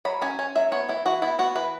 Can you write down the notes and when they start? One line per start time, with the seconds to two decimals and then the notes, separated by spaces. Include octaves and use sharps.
0.05 F#3 B5
0.22 C#4 G#5
0.39 C#4 G#5
0.55 F#3 E5
0.72 B3 C#5
0.88 E3 E4
1.05 E3 F#4
1.22 B3 E4
1.39 B3 F#4
1.55 E3 B4